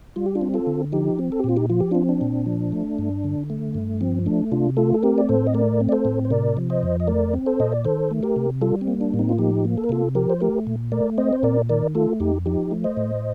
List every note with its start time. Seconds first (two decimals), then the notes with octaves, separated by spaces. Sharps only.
0.16 G3 F4
0.26 G4
0.35 D4 F4
0.41 C4
0.54 F4 A4
0.67 D3
0.92 F3 D#4 G4
1.19 C4
1.32 A4
1.39 G4
1.44 A#2 F4
1.57 D#4 G4
1.70 F3 F4
1.80 G4
1.91 C4 D4 F4
2.09 D4
2.21 A#2
2.46 F3
2.72 A3
2.99 G2
3.24 D3
3.50 A3
3.75 G2
4.01 F3 C4
4.26 A3 D4
4.52 C3 D4 F4
4.77 A3 F4 A4
4.94 A4
5.03 C4 G4 A#4
5.18 D5
5.29 A2 A4 C5
5.47 D#5
5.54 A3 A#4 D5
5.80 C4
5.89 D5
5.92 A4 C5
6.05 A2
6.25 C5
6.31 C3 A#4 D5
6.57 F3
6.70 C5 D#5
6.83 F2
7.00 D#5
7.07 A3 A#4 D5
7.34 C4
7.46 A4 C5
7.60 A#2 D#5
7.72 D5
7.85 D#3 A4 C5
8.11 A3
8.23 G4 A#4
8.36 C3
8.61 G3 F4 A4
8.81 C4
8.88 A#3
9.01 D4
9.14 A2
9.19 C4 D#4
9.29 F4
9.38 F3 D#4 G4
9.65 A#3
9.78 A4
9.84 A#4
9.89 C3 F4 A4
10.15 F3 G4 A#4
10.30 C5
10.41 A3 G4 A#4
10.67 A#2
10.92 A3 A#4 D5
11.18 C4 C5 D#5
11.33 C5
11.43 A#2 A#4 D5
11.69 D#3 A#4 D5
11.95 A3 F4 A4
12.20 F2 D#4 G4
12.46 F3 D#4 G4
12.71 A3
12.84 C5 D#5
12.97 A2